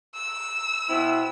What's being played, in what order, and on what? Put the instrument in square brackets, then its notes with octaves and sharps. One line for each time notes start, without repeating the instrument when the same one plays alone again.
[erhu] E6
[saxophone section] B2 C4 E4